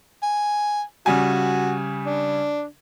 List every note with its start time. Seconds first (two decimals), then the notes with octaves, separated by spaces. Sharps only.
0.22 G#5
1.06 C#3 G3 F#4 G#5
2.06 D4